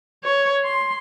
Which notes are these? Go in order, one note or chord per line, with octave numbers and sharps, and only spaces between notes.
C#5
C6